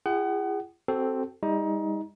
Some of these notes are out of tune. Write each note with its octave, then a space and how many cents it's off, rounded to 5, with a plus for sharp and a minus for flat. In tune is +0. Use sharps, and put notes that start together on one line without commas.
E4 +45 G#4 -30 F#5 +35
C4 +0 F#4 +25 A4 +0
G3 +40 D#4 +25